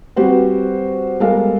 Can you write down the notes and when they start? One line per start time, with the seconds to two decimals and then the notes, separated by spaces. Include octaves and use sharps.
0.16 G3 C4 F#4 G4 B4 C5
1.20 G3 G#3 B3 A4 A#4 F5